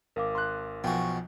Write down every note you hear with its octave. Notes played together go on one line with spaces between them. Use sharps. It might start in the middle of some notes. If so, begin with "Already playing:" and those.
G#1 A#4 F5 D6
C6 F#6
B1 B2 F3 F#4 G5 G#5 C#6